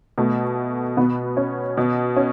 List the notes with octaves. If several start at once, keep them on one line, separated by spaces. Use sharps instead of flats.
B2 A3
B2 B3
C#4
B2
C#4